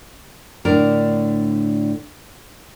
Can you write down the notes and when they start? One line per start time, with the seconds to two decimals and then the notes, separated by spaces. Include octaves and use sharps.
0.65 A2 D3 D4 A#4